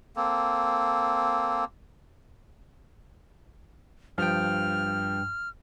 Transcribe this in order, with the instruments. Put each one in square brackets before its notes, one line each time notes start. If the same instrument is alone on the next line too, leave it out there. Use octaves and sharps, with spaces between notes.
[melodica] A#3 C4 A4
[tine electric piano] G2 G5 [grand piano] F3 [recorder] F6